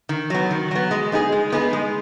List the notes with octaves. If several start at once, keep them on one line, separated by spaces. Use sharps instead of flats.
D#3
F#3 B3
D#3
F#3 B3
G#3
B3 D#4 G#4
G#3
B3 D#4 G#4
G#3